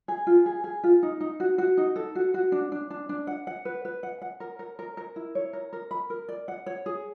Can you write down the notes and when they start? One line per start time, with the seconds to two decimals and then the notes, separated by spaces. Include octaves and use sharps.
0.08 G#4
0.27 F4
0.46 G#4
0.64 G#4
0.84 F4
1.03 D#4
1.20 D#4
1.40 F#4
1.58 F#4
1.77 D#4
1.96 A4
2.15 F#4
2.34 F#4
2.52 D4
2.72 D4
2.90 D4
3.09 D4
3.27 F#5
3.47 F#5
3.65 B4
3.85 B4
4.03 F#5
4.22 F#5
4.40 A#4
4.59 A#4
4.79 A#4
4.97 A#4
5.16 E4
5.35 C#5
5.53 A#4
5.73 A#4
5.91 B5
6.10 A#4
6.29 D5
6.48 F#5
6.66 C#5
6.86 G#4